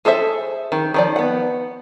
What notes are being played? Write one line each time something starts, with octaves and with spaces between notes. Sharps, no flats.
G#4 A4 C5 E5
D#3
D#3 F3 D5
B3 F#5